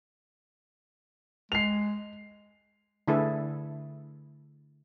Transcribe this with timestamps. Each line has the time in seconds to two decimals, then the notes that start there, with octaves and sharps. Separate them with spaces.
1.52 G#3 C7 F7
3.08 D3 A3 E4 G#4 A4 B4